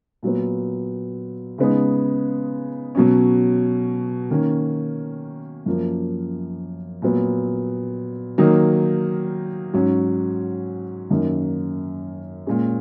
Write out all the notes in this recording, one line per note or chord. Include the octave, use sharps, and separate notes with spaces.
A#2 F#3 B3
C#3 G#3 B3 D#4
B2 F#3 C#4
D#3 A#3 C#4
F#2 F3 A#3
A#2 F#3 B3
D#3 F#3 A#3 D#4
G#2 F#3 C#4
F#2 D#3 A#3 D#4
A#2 G#3 C#4